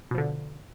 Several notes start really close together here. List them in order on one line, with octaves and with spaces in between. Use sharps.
B2 F3 D3